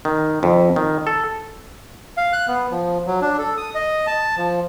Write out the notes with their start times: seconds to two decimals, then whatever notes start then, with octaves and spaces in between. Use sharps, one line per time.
0.05 D#3
0.43 F2
0.76 D#3
1.07 A4
2.17 F5
2.33 F#6
2.48 B3
2.71 F3
3.07 F#3
3.22 D4
3.39 A4
3.57 D#6
3.75 D#5
4.07 A5
4.37 F3